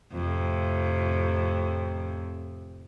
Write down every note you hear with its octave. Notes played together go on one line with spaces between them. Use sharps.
F2 A2 C3